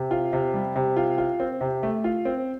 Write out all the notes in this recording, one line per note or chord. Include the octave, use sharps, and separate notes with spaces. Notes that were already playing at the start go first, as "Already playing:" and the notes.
Already playing: C3
F4
C3
G3
C3
F4
F4
C4
C3
A3
F4
C4